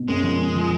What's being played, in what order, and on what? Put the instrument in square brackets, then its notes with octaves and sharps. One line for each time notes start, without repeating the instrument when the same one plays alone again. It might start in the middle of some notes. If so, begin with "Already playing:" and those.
Already playing: [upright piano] B2
[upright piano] F#2 [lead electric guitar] G#3
[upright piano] F3
F#2
F3